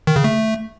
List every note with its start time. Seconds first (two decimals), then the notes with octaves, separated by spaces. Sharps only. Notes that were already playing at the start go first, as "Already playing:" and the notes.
0.07 D#3
0.16 C#3
0.24 A3